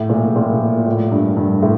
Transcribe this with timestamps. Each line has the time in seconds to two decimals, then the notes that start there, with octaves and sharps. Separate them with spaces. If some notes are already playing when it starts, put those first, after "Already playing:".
Already playing: A2
0.10 A#2
0.36 A#2
0.86 A2
1.12 G2
1.37 G2
1.62 A2